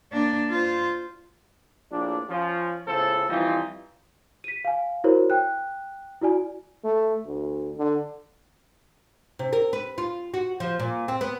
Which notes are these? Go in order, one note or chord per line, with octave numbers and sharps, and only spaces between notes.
A#3 D4
F4 C5
A#1 A2 D4
F3 C#4
C#2 A2 C#3 B3 A4 C5
E3 F3 G3 C4 D#4 F4
B6 D#7
F5 G#5
E4 F#4 A#4 C5 C#5
G5 F#6
E4 F#4 D5 G#5
A3
D2
D3
C3
A#4
B4
F4
F#4
F3
A#2
C4
B3